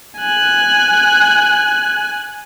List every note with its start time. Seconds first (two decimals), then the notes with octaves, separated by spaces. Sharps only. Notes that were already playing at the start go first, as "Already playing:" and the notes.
0.18 G#5 F#6